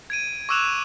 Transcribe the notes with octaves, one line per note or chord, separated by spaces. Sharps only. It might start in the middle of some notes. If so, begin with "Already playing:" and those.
G#6 D7 D#7
C#6 D6 E6 F#6 E7 F7